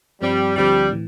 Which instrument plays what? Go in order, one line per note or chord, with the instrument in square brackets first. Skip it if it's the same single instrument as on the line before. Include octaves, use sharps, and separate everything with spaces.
[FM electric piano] G2 F3 C4 [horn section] G3
[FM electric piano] D2 D3 F3 C4 G4 [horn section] G3
[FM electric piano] A2 E3